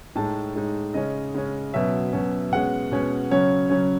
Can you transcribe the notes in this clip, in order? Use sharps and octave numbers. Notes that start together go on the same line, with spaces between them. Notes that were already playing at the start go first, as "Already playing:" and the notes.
A2 G#3 D#4 A5
A2 G#3 D#4
C#3 G#3 C#4 D#5
C#3 G#3 C#4
B2 F#3 C#4 E5
B2 F#3 C#4
B2 G#3 C#4 F#5
B2 G#3 C#4
C#3 F#3 C#4 C#5
C#3 F#3 C#4